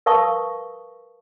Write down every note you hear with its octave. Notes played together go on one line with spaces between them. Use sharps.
A#4 B4 F5 A5 C#6 D#6